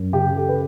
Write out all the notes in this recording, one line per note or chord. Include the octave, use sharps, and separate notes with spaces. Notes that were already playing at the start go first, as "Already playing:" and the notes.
Already playing: F#2
C#3 G4
A4
B4